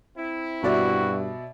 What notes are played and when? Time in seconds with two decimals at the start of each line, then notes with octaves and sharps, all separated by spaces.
0.16 C4 E4
0.63 G2 B2 F#4 D5 E5